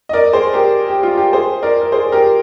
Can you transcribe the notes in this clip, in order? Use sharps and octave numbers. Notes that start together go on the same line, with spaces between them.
D#5
A#4 D5
G#4 C5
G4 A#4
G4
F4
G4
G#4 C5
A#4 D5
A#4
G#4 C5
G4 A#4